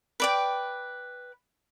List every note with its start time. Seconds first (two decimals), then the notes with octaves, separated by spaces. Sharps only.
0.20 B4 D5 G5